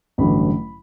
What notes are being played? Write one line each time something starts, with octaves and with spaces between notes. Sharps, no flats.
A1 G2 D3 F#3 B5